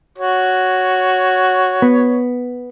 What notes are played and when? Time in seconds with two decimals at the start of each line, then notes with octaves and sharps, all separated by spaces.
0.18 F#4 C#5
1.82 B3